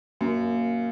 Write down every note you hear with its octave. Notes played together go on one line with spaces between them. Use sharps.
F#2 A#3